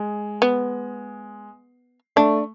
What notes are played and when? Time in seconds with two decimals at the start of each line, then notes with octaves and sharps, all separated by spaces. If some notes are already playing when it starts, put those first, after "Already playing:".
Already playing: G#3
0.42 B3
2.16 A3 D4